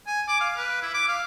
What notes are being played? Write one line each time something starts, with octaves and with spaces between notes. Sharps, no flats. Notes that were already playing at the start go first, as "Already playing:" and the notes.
G#5
D6
F5
B4
E4
D6
F5